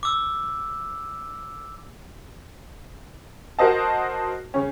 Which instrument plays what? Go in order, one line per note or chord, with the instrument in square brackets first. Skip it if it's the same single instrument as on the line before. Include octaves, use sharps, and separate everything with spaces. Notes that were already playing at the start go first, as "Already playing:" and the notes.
[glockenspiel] D6 E6
[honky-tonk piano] F#4 A#4 C5 D#5 A5
C#3 C#4